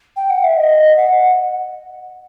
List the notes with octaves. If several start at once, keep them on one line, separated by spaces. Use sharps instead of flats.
G5
F#5
E5
D#5
F#5